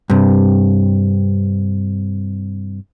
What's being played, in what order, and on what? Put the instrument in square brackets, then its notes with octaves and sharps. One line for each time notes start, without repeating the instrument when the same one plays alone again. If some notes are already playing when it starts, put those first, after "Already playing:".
[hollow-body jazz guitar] G2 C3